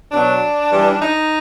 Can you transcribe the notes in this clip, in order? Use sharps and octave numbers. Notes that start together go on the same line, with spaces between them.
B2 F#3 D4
G2 E3 G3
D#4